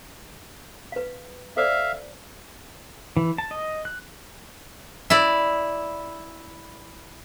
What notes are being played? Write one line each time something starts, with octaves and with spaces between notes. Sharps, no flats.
B4 F5
A4 C5 D5 E5 F5
E3
A5
D#5
F#6
E4 D5